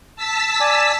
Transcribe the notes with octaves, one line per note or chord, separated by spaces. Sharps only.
A5 E6 B6
D5 G#5